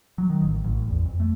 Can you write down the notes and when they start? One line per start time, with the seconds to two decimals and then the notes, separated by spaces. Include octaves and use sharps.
0.18 F#3
0.30 D#3
0.42 A1
0.64 A1
0.76 A1
0.90 E2
1.05 F2
1.20 A3